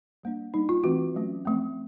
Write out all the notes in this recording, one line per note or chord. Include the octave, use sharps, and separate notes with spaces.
G3 A#3 D4
G3 A#3 D4 D#4
F4
E3 A3 C4 F#4
F#3 A3 C#4
F3 A3 C4